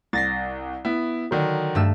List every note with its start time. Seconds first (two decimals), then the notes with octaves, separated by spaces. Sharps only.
0.13 C2 A6 A#6 C7
0.85 B3 E4
1.31 D3 D#3 F#3
1.75 G2 A3 E6